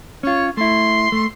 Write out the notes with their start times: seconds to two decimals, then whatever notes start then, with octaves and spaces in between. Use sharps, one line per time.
0.23 C#4 F4 C#5
0.57 A3 E4 C6
1.12 A3